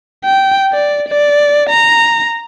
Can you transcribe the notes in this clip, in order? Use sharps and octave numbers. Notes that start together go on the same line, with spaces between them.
G5
D5
D5
A#5